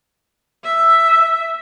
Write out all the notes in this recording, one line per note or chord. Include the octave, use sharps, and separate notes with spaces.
E5